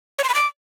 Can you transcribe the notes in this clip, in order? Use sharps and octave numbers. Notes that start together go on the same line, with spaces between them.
C#5
C6
B5
D6